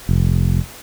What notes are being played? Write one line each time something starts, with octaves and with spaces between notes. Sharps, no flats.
F1